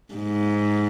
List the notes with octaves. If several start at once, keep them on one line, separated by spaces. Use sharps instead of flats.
G#2